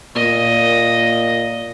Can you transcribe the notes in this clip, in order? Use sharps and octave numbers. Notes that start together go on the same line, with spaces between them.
A#2 D#5